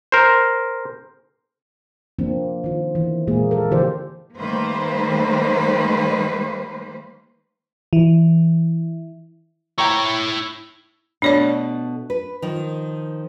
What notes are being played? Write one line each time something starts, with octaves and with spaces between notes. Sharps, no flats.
A#4 C5
F3 A#3 C4 D4
D#3 F4
E3
A#2 G#3 A#3 G#4
A4 A#4
D3 E3 G4 C5 D5
D#3 G3 A3 A#3 B4 C5
E3
E4 C#5 G5 A#5 C#6
B2 A3 D4 A4 C#5 D5
B4
D#3 F3